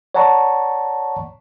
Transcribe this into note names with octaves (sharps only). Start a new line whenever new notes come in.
C#5 D5 F#5 A5 A#5 C#6